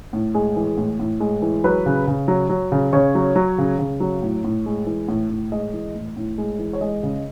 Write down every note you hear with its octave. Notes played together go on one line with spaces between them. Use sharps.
A2
G#3 G#4
E3
A2
A2
G#3
E3
F#3 B4
C#3
C#3
F#3
F#3
C#3
C#3 C#5
F#3
F#3
C#3
C#3
F#3
A2
A2
G#3
E3
A2
A2
G#3 D#5
E3
A2
A2
G#3
E3
C#5
G#3 D#5
C#3